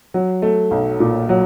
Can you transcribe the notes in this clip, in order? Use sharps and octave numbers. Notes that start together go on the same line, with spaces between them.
F#3
A3
B1
A#2
F#3